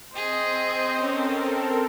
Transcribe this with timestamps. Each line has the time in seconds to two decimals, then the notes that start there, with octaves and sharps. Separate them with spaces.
0.16 C4 G#4 C5 D#5
1.01 C4 C#4 A4 A#4